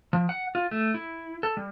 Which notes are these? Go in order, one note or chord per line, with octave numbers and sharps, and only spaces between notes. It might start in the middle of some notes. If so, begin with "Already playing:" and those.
F3
F#5
F4
A3
E4
A4
G3